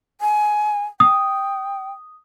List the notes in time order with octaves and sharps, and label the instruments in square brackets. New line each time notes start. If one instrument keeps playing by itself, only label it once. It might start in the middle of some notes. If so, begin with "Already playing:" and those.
[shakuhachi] G#5
[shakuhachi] G5 [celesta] D#6